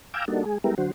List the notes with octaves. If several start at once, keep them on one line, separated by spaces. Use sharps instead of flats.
F5 G5 G#5 A#5 D6 E6
G3 A#3 D4 D#4 F#4 A4
G#3 G#4
G3 G#3 B3 E4 G4 A#4
D3 F#3 F#4 C5